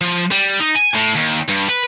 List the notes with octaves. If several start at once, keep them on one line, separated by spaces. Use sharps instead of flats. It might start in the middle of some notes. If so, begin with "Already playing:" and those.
F3
G3
D#4
G#5
A2
D#2
G2
B4